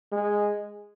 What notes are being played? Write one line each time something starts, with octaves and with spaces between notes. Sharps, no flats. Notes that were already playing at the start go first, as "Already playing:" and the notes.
G#3